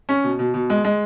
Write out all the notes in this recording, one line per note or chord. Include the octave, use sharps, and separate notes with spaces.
C#4
B2
B2
B2
G#3
G#3